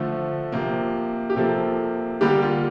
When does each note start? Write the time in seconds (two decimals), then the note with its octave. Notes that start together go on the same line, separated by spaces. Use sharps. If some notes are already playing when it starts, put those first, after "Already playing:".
Already playing: D3 F3 A3
0.52 C3 F3 A#3
1.30 G4
1.36 C3 F3 A#3 A4
2.21 D3 G3 A#3 G4
2.42 F4